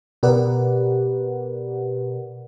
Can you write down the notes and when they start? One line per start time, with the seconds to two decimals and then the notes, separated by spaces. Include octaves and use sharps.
0.23 B2 G4 A#4 B4 D5 F#5